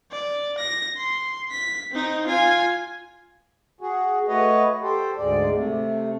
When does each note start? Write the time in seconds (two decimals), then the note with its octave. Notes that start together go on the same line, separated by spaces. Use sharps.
0.12 D5
0.57 A#6
0.97 C6
1.51 B6
1.91 C4 D#4
2.26 F4 G#5
3.81 F#4 G#4
4.28 A3 F#4 B4 C#5 D#5
4.82 G4 A4 C5
5.17 D2 G#2 G#3 D5
5.53 C3 A3